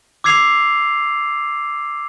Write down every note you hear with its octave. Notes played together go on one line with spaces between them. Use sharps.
D6 E6 G#6 C7 F7